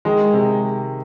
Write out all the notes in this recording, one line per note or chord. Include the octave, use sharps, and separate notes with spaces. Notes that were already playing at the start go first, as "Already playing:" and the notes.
D#3 G#3
C3